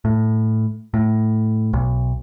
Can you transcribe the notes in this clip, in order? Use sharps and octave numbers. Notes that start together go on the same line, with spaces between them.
A2
A2
B1